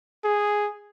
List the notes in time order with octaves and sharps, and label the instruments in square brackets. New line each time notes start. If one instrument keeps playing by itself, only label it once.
[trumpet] G#4